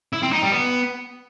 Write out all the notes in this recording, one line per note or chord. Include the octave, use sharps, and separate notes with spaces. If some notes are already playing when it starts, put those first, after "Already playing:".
E4
C4
D#4
G3
B3